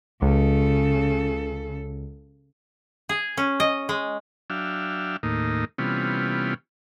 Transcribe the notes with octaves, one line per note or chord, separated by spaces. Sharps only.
C#2 C#3 A4
G#4
C#4
D#5
G#3
F#3 D4 E5 F5 G5
D#2 A2 A#3 D#4
C3 E3 G3 B3 C#4 F4